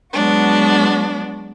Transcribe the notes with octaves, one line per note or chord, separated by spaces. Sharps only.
F#3 G#3 B3 D4 F#4